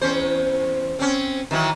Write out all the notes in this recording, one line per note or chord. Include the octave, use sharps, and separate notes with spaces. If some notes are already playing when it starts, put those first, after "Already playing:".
E2 C#4 C5
C4 C#4
D#3 E3 F#3